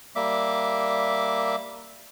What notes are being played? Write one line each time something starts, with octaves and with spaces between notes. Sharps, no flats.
G3 A#3 E5 D6